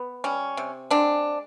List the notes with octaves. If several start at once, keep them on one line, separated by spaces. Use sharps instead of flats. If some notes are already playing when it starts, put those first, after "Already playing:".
Already playing: B3
G3 C#4
C3
G#3 C4 D4